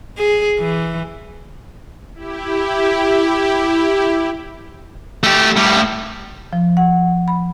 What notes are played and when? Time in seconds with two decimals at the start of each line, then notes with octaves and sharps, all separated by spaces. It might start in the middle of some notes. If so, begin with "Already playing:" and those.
0.18 G#4
0.59 E3
2.14 E4 G4
5.23 A3 G4
5.57 A2 G3
6.53 F3
6.77 F#5
7.28 B5